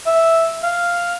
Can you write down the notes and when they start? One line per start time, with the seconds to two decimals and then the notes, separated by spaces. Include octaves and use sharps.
0.06 E5
0.63 F5